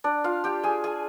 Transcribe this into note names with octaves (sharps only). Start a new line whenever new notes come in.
D4 D5
F4 F5
G4 G5
G#4 G#5
G#4 G#5